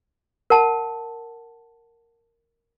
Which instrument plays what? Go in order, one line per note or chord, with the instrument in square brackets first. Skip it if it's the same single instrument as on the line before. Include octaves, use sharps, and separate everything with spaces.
[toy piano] A#4 F#5 A5